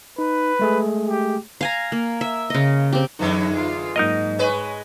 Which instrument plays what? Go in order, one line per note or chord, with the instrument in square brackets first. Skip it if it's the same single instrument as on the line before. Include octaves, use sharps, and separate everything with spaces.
[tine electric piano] D#4 [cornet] B4
[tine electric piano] G#3 A3 G#4
[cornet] G4
[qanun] F5 G#5 A#5
A#3
E5
C#3 D#5
C4 G4
[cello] F#2 F#3 [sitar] D3 E3 G#3 [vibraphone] D#4
[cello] F4
[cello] G#2 [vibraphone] F#3 A#3 D#6 [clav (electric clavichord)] D#4 A#4 D#5
[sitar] G#3 B4 [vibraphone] C#5 G#5 C#6